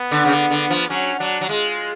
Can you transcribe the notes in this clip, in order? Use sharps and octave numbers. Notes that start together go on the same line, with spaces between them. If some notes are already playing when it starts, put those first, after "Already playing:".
Already playing: B3
D3
C#3
D3
D3
F3
F#3 C#4
F#3 D4
F#3
G#3 F4